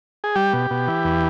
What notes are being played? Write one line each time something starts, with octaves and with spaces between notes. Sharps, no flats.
G#4
G3 G4
B2
B2
E3
E2